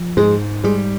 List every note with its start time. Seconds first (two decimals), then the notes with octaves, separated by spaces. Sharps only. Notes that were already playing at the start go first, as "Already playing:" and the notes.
Already playing: F3
0.17 G#2 G#3
0.64 G3 G#3